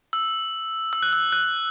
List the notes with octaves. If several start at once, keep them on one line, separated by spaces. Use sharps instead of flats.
E6
E6
F#6
E6
F#6